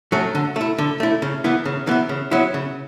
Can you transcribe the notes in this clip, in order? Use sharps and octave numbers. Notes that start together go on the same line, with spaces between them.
F#3 A3 C#4
D3
A3 E4
D3
A3 E4
C#3
E3 B3 E4
C#3
E3 B3 E4
C#3
F#3 B3 E4
C#3